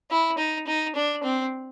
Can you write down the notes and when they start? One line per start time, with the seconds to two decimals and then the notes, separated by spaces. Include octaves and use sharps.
0.11 E4
0.38 D#4
0.67 D#4
0.95 D4
1.23 C4